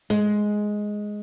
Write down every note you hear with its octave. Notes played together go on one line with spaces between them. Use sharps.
G#3